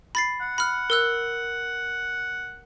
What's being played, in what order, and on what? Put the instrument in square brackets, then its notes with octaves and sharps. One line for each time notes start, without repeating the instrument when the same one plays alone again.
[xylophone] B5 A6 C7
[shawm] F#5
[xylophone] B5 F6
A#4 E6 F#6